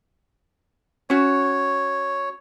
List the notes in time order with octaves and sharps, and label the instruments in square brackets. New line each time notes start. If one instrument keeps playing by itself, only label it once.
[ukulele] C#4 F#4 [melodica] C#5